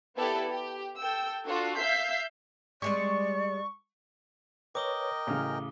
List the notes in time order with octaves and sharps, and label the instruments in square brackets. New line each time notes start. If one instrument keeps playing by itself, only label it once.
[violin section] B3 E4 G4 A4 B4 D5
G4
A4 G5 E6
D4 F4 F#4 A4
E5 F5 E6 G6 B6 C7
[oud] G3 G#3 C4 [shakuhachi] D5 [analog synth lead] C#6
[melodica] A#4 D#5 G5 [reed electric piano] B4 C#5 [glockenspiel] D6 D#6 G7
[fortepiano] A1 C#3 [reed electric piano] G#5 F6